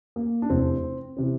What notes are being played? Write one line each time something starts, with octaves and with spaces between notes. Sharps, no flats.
A#3
D4
F1 E2 C3 E3 C4
C3 E3 C4